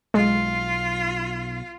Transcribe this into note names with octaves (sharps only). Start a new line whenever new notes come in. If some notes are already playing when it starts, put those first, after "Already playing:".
B1 G#3 F4